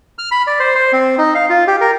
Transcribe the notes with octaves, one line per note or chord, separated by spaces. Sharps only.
F6
B5
D5
C5
C5
C4
D#4
F5
F4
G4
A#4